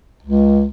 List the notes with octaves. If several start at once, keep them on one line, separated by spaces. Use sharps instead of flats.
C#2